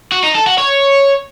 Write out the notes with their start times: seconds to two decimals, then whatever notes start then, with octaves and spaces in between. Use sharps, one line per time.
0.12 F#4
0.23 D#4
0.35 A4
0.46 F#4
0.58 C#5